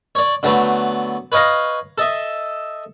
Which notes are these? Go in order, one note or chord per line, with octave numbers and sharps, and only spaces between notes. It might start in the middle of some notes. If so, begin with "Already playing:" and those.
C#5 D5
D3 F#3 A3 B3
B4 C#5 D#5 F5 A#5
A4 D#5 E5